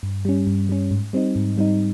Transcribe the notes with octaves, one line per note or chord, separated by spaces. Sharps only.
G2
G3 C#4
G2
G3 C#4
G#2
G3 C4 D#4
G#2
G3 C4 D#4